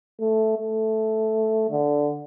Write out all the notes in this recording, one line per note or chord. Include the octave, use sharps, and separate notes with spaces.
A3
A3
D3